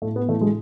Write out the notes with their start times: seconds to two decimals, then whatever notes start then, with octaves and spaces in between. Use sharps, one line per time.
0.02 A2 A3
0.16 B3
0.28 E3 A3
0.41 G#3